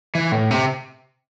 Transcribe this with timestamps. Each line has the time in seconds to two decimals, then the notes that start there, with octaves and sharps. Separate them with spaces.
0.15 E3
0.32 A2
0.51 C3